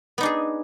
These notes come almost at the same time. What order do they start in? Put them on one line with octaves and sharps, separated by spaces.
B3 D#4 D4 G#4